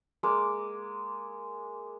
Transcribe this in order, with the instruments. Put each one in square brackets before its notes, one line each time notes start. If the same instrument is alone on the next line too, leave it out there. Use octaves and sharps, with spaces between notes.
[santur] G#3 A#3 D6